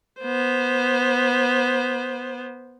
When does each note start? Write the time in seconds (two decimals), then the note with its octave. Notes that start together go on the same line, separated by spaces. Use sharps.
0.20 B3 C5